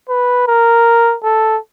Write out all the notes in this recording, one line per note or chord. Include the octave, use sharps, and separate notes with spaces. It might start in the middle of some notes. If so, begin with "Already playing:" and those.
B4
A#4
A4